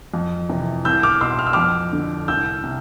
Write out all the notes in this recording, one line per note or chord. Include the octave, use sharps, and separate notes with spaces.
F2
C3 E3
C2 E6 G6
D6 F6
B2 C6 E6
F6
E6
F2 D6 F6
D3
C2 E6 G6
C3